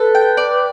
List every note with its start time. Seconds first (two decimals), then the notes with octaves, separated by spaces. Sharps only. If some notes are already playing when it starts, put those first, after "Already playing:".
Already playing: A4 B4
0.15 G5
0.37 D5